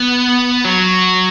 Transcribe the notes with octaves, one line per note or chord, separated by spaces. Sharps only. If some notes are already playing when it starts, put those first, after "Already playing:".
Already playing: B3
F#3